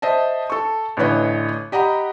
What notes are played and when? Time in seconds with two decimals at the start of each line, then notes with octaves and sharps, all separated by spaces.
0.02 C5 D#5 E5 A5
0.50 A4 C#6
0.97 A1 D3 E3 B4 C#5 D#5
1.72 G4 D#5 F#5 A#5 B5